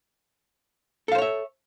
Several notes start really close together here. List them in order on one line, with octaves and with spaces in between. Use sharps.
A4 F5 C5 C#5 E5